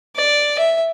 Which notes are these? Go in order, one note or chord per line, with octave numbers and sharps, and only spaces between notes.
D5
E5